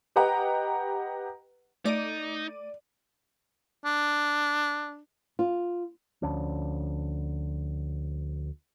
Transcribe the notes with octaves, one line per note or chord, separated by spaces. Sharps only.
G4 B4 D#5 F#5 G5 A#5
A3 D#4 D5 D6 D#7
D4
F4
D2 F3 C#4 D4